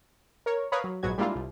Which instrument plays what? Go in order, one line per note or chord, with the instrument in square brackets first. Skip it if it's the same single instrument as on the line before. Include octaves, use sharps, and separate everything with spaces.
[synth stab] A#4 C#5
A#4 B4 C#5 F5 B5 D#6
F#3
A#1 G#2 F#3 B3 F#4 G#6
G3 G#3 A#3 D4 E4 F4
C2